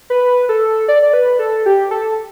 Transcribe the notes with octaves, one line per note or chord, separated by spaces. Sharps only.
B4
A4
D5
D5
B4
A4
G4
A4